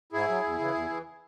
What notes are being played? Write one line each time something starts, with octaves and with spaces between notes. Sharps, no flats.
G#2 E4 G#4
F#3
E2
C#3 E3
E2
E3